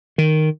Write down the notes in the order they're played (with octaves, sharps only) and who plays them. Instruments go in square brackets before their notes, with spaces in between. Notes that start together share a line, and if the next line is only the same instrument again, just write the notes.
[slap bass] D#3